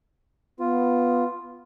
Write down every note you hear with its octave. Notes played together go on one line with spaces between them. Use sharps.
B3 F4